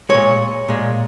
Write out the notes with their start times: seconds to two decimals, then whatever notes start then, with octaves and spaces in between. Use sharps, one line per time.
0.09 A#2 G#3 C#5
0.68 A#2 G#3